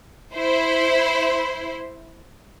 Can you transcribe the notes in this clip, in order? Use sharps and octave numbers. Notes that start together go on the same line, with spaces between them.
E4 C5